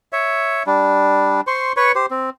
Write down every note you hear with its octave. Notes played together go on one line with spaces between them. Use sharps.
C#5 E5
G3 D4
C5 C6 C#6
B4 C#5 C#6
G4 C5
C4